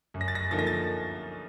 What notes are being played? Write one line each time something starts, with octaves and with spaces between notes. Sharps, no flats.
F#2
A#6
A6
A#6
D3 F3 A#3 D#4 A6
A#6
A6